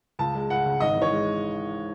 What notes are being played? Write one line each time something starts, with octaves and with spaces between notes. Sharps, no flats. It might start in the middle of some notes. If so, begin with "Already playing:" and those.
C#2 A5
G#3
C#2 F#5
C#3
G#1 D#5
E3
C#5
G#3